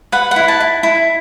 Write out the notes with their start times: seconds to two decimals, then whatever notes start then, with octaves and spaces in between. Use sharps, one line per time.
0.12 B4 F#5
0.31 E4 F#5
0.48 A5
0.60 E4
0.83 E4